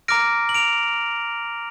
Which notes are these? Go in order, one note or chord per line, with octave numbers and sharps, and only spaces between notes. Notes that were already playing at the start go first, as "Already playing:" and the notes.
A#5 D6 F6 A#6 D7
F#7
D7 F7